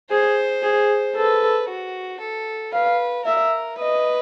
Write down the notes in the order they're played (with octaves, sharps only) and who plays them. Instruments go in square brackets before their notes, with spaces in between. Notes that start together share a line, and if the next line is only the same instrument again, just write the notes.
[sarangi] G#4 [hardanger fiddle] C5
[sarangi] G#4
[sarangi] A4 [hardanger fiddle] B4
[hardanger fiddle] F#4
A4
[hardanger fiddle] B4 [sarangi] F5
[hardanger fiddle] A#4 [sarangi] E5
[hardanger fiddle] B4 [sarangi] D#5